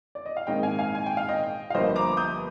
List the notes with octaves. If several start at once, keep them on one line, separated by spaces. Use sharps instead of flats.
D5
D#5
F5
A#1 G#2 D#3 G#3 C4 D#5 G5
F5 G#5
F5 G#5
G#5
G5
F5
D#5 G5
F5
G1 G2 F3 A#3 C5 D#5
A#5 D6
D#6 G6